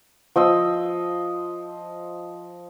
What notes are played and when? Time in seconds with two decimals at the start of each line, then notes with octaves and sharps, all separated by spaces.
0.36 F3 D#5 E6